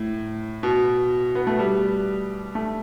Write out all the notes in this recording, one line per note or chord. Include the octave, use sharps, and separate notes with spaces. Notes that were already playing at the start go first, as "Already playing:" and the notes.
Already playing: A2
B2
B3
A3
G3
A3